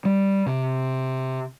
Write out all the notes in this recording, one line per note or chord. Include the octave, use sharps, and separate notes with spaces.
G3
C3